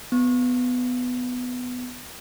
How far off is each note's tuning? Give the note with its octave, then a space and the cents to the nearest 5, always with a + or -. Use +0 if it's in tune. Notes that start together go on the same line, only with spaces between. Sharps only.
B3 +15